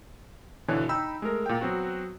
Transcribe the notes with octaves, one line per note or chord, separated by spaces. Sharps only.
G#1 B2 D3 E3 C#5 G#5
D#4 G5 B5 E6
G#3 A3 A#4
A#2 G5
F#3 B3 C4 F#4